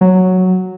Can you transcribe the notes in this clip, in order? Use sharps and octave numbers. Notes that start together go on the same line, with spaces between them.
F#3